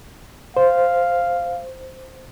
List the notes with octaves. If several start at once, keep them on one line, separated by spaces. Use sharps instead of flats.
C5 F5